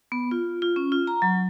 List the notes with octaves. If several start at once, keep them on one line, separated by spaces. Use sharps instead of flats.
B3
F4
F4
C#4
F4
A#5
F#3